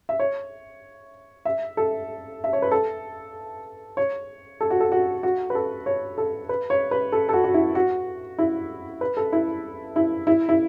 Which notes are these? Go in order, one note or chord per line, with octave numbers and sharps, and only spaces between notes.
E5
C#5
E5
A4
E5
C#5
B4
A4
C#5
A4
F#4
A4
F#4
F#4
B4
A4
C#5
A4
B4
C#5
B4
A4
A4
F#4
F#4
E4
F#4
E4
B4
A4
E4
E4
E4
E4